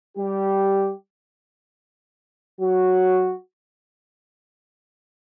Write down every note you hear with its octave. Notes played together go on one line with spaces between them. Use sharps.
G3 G4
F#3 F#4